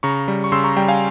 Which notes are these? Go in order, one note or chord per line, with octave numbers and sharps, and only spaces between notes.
C#3 A#5 C#6
G3
C#6
C#3 C6 E6
A#5 C#6
G3 G5 A#5
F5 G#5